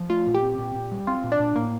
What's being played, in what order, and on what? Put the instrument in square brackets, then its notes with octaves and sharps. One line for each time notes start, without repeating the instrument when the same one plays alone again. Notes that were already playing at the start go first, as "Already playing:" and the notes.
Already playing: [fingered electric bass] F3
[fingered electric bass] A3 [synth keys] F4
[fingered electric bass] A#2
[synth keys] G4
[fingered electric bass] C4
A#2
A#2
G3
[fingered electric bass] C4 [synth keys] F4
[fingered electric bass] A#2
[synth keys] D4
[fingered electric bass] A#2
[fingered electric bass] A2 [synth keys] A#3